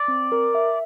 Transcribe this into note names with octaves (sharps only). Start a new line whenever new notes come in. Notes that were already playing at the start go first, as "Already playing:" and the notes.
Already playing: D5
C4
A#4
E5